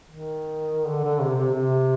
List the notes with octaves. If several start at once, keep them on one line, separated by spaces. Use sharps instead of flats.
D#3
D3
D3
C3
C3
C3